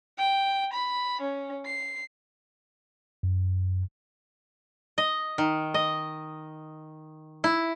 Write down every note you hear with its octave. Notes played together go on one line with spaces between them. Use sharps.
G5
B5
C#4
C7
F#2
D#5
D#3
D#5
E4